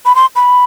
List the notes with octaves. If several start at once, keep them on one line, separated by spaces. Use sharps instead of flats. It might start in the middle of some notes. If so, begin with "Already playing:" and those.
B5
C6
B5